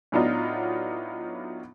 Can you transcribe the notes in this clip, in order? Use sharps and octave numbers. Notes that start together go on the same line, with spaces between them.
A2 F#3 B3 D4 D#4 F4